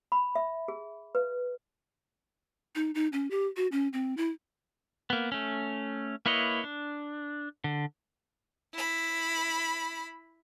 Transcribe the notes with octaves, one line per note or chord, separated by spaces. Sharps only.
B5
E5
G#4
B4
D#4
D#4
C#4
G4
F#4
C#4
C4
E4
A#3 B3
A3 C#4
A#3 E4 B4 C#5 D#5
D4
D3
E4 B5